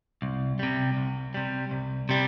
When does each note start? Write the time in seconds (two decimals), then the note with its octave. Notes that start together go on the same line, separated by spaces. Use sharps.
0.22 C2
0.59 C3 G3
0.97 C2
1.34 C3 G3
1.71 C2
2.09 C3 G3